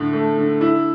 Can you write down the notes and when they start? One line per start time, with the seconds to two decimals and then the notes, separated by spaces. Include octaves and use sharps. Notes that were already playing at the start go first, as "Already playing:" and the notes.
Already playing: A2 D3
0.13 A3
0.37 D3
0.61 E4